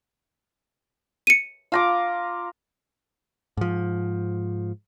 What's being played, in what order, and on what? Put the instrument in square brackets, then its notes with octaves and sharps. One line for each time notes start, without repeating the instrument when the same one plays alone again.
[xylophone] C#7 D#7
[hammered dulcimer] F4 A#5 D6
[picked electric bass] G#2 F3